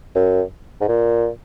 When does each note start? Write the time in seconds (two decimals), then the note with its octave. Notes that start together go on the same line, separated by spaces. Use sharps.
0.15 F#2
0.81 G#2
0.88 A#2